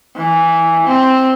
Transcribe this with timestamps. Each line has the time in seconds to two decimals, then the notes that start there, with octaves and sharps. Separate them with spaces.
0.16 E3
0.87 C4